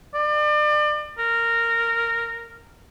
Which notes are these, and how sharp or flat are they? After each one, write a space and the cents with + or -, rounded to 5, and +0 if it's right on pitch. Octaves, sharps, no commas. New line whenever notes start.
D5 +35
A#4 -10